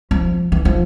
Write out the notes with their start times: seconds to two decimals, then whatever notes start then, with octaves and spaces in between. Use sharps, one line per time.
0.11 F3
0.52 E3
0.65 F3